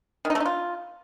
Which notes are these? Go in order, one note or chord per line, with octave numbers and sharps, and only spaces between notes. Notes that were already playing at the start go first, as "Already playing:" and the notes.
D#3
D#4
A3
D#4
F4